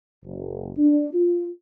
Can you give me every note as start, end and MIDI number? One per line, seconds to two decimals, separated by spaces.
0.23 0.70 30
0.78 1.09 62
1.14 1.47 65